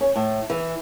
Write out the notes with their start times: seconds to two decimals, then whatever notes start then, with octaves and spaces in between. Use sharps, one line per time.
0.01 C#4
0.15 A2
0.50 E3